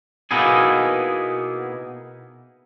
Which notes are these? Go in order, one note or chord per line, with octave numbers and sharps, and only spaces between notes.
B2 A#3 B3 D#4 E4 G#4